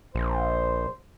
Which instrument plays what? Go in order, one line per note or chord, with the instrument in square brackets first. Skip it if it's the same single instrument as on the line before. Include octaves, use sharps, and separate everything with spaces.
[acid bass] A#1 [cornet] C5